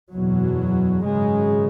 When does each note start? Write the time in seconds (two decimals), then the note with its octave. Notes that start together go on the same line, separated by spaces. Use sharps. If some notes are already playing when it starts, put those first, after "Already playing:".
0.12 F#1 E2 B2 F#3
1.05 G#1 F#2 C#3 G#3